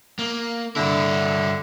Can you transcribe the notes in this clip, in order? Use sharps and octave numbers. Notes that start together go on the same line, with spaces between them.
A#3
G2 D3 E4